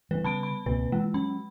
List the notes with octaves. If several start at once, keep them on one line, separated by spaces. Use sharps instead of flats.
E3 G3 G#3 B3 B4
C#3 A5 B5 D7
B5
C#2 B2 A#3 C4 B4
E3 G#3
F#3 C#4 B5